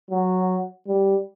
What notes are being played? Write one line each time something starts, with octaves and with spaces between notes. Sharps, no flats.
F#3
G3